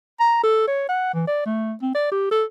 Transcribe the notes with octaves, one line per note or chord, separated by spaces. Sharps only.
A#5
A4
C#5
F#5
E3
D5
A3
C4
D5
G4
A4